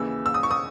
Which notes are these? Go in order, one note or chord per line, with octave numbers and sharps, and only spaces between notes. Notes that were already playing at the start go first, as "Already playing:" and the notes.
Already playing: D#2 C#3 E3 E6
E6
D#6
C#6
D#6